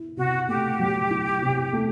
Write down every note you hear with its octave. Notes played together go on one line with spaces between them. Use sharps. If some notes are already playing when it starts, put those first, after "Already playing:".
Already playing: E4
C3 F#4
A3 G4
F#3
E4
C3
A3